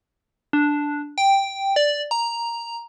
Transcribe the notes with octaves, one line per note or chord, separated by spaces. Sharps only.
D4
G5
D5
A#5